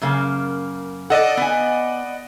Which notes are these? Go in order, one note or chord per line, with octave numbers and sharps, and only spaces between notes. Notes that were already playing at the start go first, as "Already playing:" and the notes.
F#2 C#3 A#3
A4 D5 D#5 F#5
B3 G#5